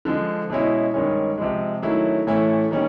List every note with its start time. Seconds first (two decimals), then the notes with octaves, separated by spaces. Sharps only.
0.05 D3 F3 G#3
0.50 B2 G#3 C#4 E4
0.94 G2 D#3 G#3 C#4
1.38 C3 F3 G#3
1.82 D#3 F#3 A3 C#4 E4
2.27 A2 E3 A3 C#4 E4
2.71 D#3 G3 A#3 C#4